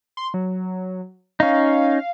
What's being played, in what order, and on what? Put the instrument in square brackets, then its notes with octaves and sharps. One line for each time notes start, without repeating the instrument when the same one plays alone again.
[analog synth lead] C6
F#3
[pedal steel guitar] C#4 D#4 [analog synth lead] F5